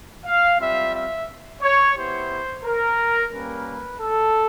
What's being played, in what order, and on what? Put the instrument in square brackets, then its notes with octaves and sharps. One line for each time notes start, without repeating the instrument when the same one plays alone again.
[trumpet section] F5
G3 C4 F4 E5
E5
C#5
B3 E4 G4 C5
A#4
G3 A#3 C#4 B4
A4